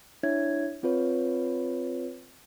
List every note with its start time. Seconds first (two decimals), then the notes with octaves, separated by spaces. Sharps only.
0.23 D4 E4 C#5 E5 G#6
0.83 C4 F4 B4 C#5